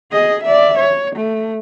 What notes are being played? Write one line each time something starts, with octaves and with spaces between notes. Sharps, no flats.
G#4 D#5
D5 E5
C#5
A3